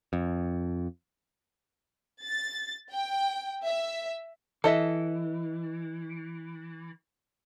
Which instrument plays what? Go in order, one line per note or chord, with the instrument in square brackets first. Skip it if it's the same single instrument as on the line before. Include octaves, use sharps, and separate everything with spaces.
[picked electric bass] F2
[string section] A6
G5
E5
[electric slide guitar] E3 [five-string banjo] A4 D#5 E5